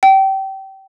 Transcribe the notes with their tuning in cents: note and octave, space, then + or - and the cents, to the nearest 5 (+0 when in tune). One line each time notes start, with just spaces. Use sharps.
G5 -25